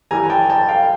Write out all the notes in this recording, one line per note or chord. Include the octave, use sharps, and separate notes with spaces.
G2 E3 G3 G#5 A#5
G5 A5
G5 A5
F5 G5